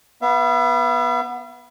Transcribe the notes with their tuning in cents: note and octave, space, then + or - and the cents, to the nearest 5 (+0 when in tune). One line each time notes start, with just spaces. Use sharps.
B3 -15 E5 +40